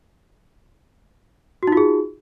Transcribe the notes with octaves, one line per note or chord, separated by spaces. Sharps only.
D#4 F4 F#4 G#4